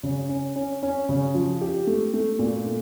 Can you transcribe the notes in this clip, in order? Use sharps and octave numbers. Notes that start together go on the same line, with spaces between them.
C#3
C#4
C#4
C#4
C#3
F3
G4
A3
A3
A#2
A3